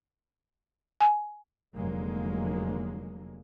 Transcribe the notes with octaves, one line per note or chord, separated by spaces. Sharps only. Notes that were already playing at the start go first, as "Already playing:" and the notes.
G#5
F1 D3 F#3 G#3 A#3